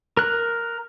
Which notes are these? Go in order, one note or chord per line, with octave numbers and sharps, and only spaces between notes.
A#4 F#6